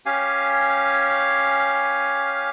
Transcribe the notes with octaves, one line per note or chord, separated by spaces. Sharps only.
C#4 G4 F5 G#5